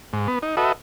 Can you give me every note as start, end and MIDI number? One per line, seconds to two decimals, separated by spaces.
0.13 0.28 44
0.28 0.39 59
0.42 0.56 63
0.57 0.72 66
0.57 0.72 69
0.57 0.72 71
0.57 0.72 75
0.57 0.72 76